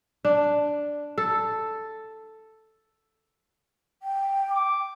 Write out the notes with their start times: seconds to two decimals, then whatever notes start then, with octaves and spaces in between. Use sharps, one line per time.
0.25 D4
1.18 A4
4.03 G5
4.51 D6